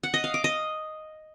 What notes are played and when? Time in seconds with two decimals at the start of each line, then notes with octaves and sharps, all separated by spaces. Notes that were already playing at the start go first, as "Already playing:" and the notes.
0.03 F#5
0.14 D#5
0.24 F5
0.34 D6
0.44 D#5